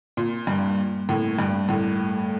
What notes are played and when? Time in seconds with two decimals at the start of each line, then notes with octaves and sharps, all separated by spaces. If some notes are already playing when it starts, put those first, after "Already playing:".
0.17 A#2
0.47 G2
1.09 A2
1.39 G2
1.69 A2